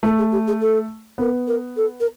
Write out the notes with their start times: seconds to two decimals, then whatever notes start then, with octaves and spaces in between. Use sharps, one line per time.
0.03 A3 A4
0.18 G#4
0.31 G4
0.47 G#4
0.61 A4
1.18 B3 A#4
1.47 A#4
1.76 A4
2.00 A#4